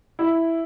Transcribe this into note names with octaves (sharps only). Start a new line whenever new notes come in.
E4